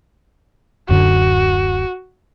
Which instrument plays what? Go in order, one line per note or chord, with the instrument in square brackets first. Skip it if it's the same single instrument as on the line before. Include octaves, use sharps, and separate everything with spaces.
[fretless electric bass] D1 F#2 D3 [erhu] F#4